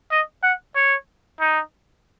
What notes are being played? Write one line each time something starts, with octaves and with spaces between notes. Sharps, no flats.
D#5
F#5
C#5
D#4